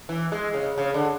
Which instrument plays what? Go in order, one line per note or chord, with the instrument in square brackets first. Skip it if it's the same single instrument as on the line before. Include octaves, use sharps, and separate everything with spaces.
[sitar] E3
G#3
C#3
C#3
D3